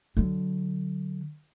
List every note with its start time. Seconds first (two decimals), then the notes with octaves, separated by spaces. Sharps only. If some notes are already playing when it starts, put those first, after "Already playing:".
0.17 D3 F#3